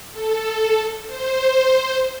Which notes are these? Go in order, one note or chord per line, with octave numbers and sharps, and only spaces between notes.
A4
C5